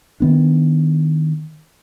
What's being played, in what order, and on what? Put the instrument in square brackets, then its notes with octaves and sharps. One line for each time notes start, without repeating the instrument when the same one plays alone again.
[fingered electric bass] D#3 B3 D4